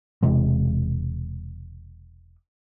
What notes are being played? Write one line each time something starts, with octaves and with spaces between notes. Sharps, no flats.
E1 C3 G#3